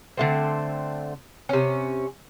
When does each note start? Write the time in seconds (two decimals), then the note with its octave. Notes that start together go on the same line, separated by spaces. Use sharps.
0.17 D3 A3 C4
1.49 C3 C#4